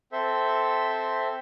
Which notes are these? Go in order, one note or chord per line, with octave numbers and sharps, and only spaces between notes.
C4 A4 C5 E5